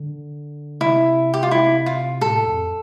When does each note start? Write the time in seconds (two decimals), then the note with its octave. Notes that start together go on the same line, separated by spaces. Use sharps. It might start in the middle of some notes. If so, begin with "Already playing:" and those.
Already playing: D3
0.81 C3 E4
1.34 G4
1.43 F4
1.51 E4
1.86 F4
2.21 A2 A4
2.45 F2